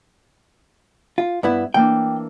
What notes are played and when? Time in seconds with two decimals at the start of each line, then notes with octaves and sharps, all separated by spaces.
1.18 F4
1.43 G2 B3 E4
1.74 E3 A#3 D4 G5